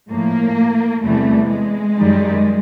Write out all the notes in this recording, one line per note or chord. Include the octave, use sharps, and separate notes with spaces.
A2 F3 A#3
E2 C3 E3 G3 A3
G#3
F#2 D#3 G3